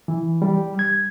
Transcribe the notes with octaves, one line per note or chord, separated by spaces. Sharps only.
E3
G3
G#6